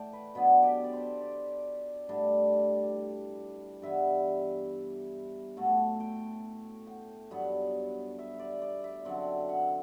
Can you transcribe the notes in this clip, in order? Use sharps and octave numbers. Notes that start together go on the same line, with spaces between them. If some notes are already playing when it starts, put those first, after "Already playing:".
Already playing: A2 A3 D5 G5 A5
B4
B2 F#3 B3 D4 B4
G4
D5
C5
D5
A2 G3 D4
G2 E3 B3 E5
A2 F#3 A3 F#5
G5
G5
G2 F#3 B3 F#5
E5
D5
D5
E5
F#2 D3 F#3 C4 F#5
F#5